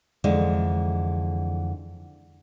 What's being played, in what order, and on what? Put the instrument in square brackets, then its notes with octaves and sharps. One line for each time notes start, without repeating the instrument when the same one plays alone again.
[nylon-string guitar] F2 D3 E3 G#3